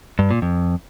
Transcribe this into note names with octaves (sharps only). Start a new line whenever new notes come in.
G2
A#2
F2